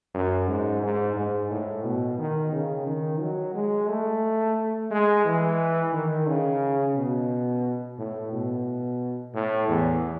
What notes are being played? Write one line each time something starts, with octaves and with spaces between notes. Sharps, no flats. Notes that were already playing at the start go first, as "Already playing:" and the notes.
F#2
G#2
G#2
G#2
A2
B2
D#3
C#3
D#3
F#3
G#3
A3
G#3
E3
D#3
C#3
B2
A2
B2
A2
E2